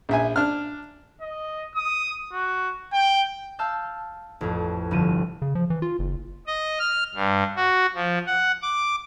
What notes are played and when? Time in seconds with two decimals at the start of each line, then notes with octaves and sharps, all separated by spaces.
0.09 A#1 E5 G#5
0.36 D4 F6
1.21 D#5
1.75 D#6
2.32 F#4
2.93 G5
3.59 F5 A5 E6 F6 G6
4.41 A1 F2
4.91 G1 C2 F3 D#7 E7
5.42 C#3
5.55 F3
5.70 E3
5.82 F4
5.99 F#1
6.47 D#5
6.79 F6
7.15 G2
7.56 F#4
7.94 F3
8.27 F#5
8.62 D6